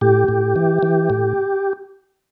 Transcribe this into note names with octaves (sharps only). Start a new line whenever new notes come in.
A2 G4
A2
E3
E3
A2